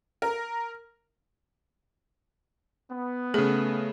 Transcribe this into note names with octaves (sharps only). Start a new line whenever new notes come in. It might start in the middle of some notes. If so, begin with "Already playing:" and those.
A#4
B3
C#3 A3 G#4